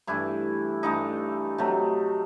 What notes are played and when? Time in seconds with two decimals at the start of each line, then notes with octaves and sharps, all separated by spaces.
0.07 G2 E3 A3 E4
0.83 G2 E3 A3 D#4
1.58 C3 F#3 A3